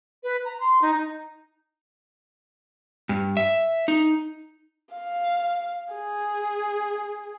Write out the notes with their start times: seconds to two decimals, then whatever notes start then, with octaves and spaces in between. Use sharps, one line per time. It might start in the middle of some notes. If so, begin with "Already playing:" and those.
0.23 B4
0.45 A#5
0.60 C6
0.82 D#4
0.95 D#4
3.09 G2
3.37 E5
3.88 D#4
4.94 F5
5.94 G#4